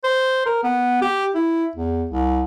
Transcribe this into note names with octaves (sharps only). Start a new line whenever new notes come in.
C5
A#4
B3
G4
E4
E2
C2